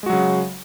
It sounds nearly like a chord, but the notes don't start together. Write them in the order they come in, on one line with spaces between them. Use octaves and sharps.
G#3 F#4 F#3 C#3